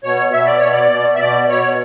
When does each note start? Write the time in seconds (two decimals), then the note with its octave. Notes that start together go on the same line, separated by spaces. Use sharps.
0.04 B2 C#5
0.33 B2 E5
0.46 D5
0.59 B2 C#5
0.72 D5
0.91 B2
1.15 E5
1.20 B2 D5
1.49 B2 C#5